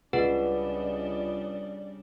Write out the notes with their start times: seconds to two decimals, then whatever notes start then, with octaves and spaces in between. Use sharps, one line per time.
0.13 C#2 C#3 G3 D4 G#4 B4 D5 F#5